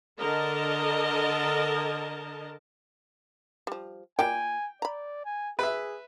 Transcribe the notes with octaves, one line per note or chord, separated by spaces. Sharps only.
D3 A#4 D#5 A5
F3 G3
A#3 F4 D5 G5 G#5
D5 A#5 B5
G#5
G#4 B4 E5